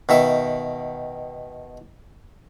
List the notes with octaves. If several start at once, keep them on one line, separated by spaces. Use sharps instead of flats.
B2 D#3 E5